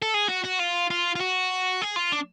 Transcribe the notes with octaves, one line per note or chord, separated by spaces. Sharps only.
A4
G#4
F#4
F#4
F4
F4
F4
F#4
G#4
F4
D4